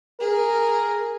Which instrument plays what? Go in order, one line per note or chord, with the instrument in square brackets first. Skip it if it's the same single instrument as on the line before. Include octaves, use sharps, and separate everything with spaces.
[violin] G#4 [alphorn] A#4